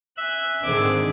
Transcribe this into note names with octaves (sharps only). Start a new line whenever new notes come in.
E5 G#5 F#6
G#2 D3 D#3 C4 G#4 D6